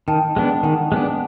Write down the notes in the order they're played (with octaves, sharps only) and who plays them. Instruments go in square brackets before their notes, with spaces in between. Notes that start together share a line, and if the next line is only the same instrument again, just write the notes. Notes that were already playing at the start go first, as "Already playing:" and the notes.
[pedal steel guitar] D#3 [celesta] G5 A5
[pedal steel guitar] G#3 B3 D4
[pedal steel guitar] D#3 [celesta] F#5 G#5
[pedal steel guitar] G#3 B3 D4